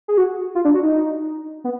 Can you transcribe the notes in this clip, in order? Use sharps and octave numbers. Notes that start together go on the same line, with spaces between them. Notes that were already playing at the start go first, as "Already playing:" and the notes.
G#4
F#4
F4
D4
F#4
D#4
B3